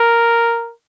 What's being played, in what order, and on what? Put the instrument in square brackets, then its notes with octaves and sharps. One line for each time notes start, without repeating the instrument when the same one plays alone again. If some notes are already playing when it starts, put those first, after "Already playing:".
Already playing: [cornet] A#4